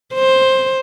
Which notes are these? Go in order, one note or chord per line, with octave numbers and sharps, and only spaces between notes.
C5